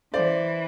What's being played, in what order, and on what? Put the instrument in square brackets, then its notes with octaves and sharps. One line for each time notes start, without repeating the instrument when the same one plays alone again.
[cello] E3 [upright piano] C5 D5